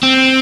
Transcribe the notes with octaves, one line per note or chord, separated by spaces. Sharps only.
C4